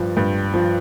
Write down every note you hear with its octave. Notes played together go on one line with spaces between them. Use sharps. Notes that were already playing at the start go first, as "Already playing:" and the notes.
Already playing: G2 F3
G2
F3